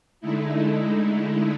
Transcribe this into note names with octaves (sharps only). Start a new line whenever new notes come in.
D3 G#3 A3 D#4 E4